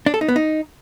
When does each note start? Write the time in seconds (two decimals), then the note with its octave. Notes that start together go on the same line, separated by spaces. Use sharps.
0.06 D4
0.14 A4
0.21 D#4
0.28 B3
0.36 D#4